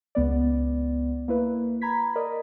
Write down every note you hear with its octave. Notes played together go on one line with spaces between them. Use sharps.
C#2 B3 D5
A#3 E4 B4
A#5 B5 G#6 B6
A#4 D5 D#5